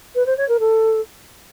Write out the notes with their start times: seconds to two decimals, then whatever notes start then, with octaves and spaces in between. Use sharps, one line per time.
0.15 B4
0.26 C5
0.37 C#5
0.48 A#4
0.59 A4